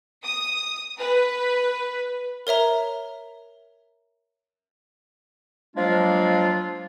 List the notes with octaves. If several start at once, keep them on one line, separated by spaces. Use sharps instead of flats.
D#6
B4
A#4 C#5 E5 A#5
F3 F#3 G#3 A#3 D4 F4